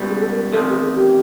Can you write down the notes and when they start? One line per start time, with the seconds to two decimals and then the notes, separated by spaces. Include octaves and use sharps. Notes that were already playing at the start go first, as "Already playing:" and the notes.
Already playing: C#2 B2 G3
0.09 G#4
0.20 A4
0.31 A#4
0.52 E2 C3 D#3 A4
0.69 G4
0.74 G#4
0.95 G4